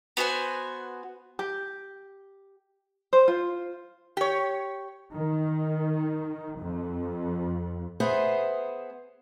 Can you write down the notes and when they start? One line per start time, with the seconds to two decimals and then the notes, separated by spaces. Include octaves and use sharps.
0.17 B3 F#4 C5 G#5
1.39 G4
3.13 C5
3.28 F4
4.17 G4 C#5
5.14 D#3
6.59 F2
8.00 B3 G#4 C5 E5